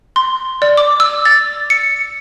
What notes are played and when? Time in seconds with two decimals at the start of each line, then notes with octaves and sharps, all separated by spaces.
0.16 C6
0.62 D5
0.77 D6
1.00 E6
1.25 A6
1.70 C#7